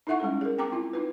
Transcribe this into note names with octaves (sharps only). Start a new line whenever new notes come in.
D#4 E4 A4 E5 F#5 C#6
G3 G#3 C#4 A4
G#4 A#4
C4 G5 A#5 D6
E4 F4
D#4 F4 B4